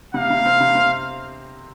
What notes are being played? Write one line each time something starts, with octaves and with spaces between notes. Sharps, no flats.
C3 F5
C3
C4
C3
C4